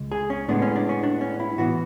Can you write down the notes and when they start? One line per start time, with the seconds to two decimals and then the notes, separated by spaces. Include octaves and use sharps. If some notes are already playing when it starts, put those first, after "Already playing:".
Already playing: C#2 G#3
0.12 G#4
0.30 C#4
0.48 A2 G#3 B3 D4
0.62 C#4
0.76 D4
0.89 C#4
1.03 D4
1.21 C#4
1.40 E4
1.58 A2 E3 B3 F#4